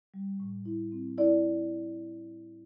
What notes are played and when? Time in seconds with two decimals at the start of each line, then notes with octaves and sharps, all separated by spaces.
0.14 G3
0.40 A2
0.65 E4
0.92 C4
1.18 E4 D5